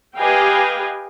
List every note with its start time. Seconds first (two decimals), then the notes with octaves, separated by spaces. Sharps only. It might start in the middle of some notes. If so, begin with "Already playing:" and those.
0.18 G4 B4 D#5 F5 G5 G#5